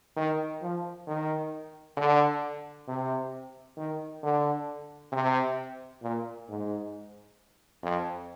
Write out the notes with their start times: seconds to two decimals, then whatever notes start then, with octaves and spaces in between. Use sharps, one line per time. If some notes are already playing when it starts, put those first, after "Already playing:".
0.16 D#3
0.62 F3
1.07 D#3
1.97 D3
2.88 C3
3.77 D#3
4.23 D3
5.12 C3
6.03 A#2
6.49 G#2
7.83 F2